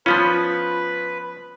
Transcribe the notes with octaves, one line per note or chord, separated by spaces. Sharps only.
F3 B3 C#4 F4 B4